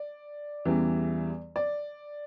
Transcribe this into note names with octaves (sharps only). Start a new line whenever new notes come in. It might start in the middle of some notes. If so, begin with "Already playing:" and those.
Already playing: D5
E2 C#3 E3 G3
D5